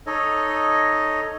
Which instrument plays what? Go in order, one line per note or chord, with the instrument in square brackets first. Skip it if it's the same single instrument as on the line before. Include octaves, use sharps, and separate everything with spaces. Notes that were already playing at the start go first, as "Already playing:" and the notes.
[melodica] D#4 A4 C#5 D#5